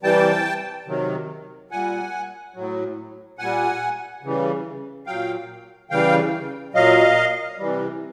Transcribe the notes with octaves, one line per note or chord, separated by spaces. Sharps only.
C3 E3 G3 G5 A5
C3 D#3 F#3
A#2 G3 F#5 G#5
A2 F#3
A#2 G3 F#5 G#5
C#3 E3 G3
A#2 F#3 F5 G5
C#3 E3 G3 F5 G5
A#2 F#3 D#5 F5
C3 E3 G3